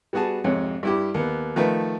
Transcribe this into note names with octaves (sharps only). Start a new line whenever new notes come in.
G3 B3 F#4 G#4 A5
F2 G#2 C3 C#5
G2 E4 G4
D#2 B3
D#3 F3 A3 B4